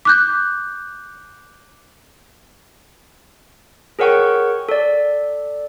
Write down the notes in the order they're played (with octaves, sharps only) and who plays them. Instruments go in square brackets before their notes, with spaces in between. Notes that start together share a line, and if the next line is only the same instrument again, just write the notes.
[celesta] D6 F#6 G6
[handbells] G#4 A#4 C#5 F#5 G5 C#6
A4 D5